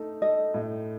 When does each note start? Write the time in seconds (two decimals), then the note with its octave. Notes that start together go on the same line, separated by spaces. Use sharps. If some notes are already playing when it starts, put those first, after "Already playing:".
Already playing: A3 D#4 A4
0.22 A4 D#5
0.54 A2